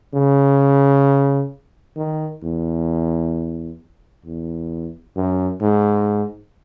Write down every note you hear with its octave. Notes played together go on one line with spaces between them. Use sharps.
C#3
D#3
E2
E2
F#2
G#2